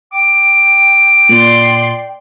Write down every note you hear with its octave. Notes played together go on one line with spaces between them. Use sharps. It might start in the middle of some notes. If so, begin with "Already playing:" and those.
G5 D6
A#2 D5 C6